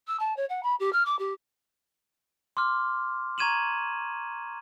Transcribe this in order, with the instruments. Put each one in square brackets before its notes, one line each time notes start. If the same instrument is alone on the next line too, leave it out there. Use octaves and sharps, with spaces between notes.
[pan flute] E6
A5
C#5
F#5
B5
G4
F6
D6
G4
[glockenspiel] C6 D6 F6
A#5 C#6 G#6 D#7 E7 F#7